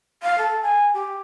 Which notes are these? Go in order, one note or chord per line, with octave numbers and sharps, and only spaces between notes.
F5
A4
G#5
G4